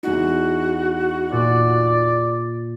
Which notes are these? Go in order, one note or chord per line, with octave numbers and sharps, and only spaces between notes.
E2 D#4 F#4
A#2 D5